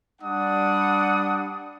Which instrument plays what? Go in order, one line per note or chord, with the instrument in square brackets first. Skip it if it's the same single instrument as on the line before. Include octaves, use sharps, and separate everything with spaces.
[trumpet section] G3 D4 F#5 D#6